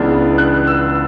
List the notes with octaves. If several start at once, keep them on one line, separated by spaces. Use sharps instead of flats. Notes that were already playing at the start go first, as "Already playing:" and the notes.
Already playing: C#2 C#3 E3 B3 D4
F#6
E6